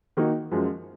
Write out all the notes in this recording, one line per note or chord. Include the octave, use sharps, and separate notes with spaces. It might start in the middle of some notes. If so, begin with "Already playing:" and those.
D#3 A#3 D#4 F#4
F#2 F3 G#3